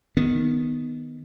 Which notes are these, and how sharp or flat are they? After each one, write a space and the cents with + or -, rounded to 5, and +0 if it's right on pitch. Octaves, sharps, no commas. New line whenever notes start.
D#3 +0 B3 +0